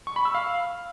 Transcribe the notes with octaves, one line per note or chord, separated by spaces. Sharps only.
C#6
B5
E6
F5